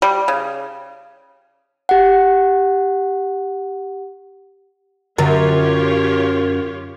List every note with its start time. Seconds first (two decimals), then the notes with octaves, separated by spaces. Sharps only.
0.02 G3
0.28 C#3
1.89 G4 F#5
5.18 F#2 D3 F4 G4 A#4 C#5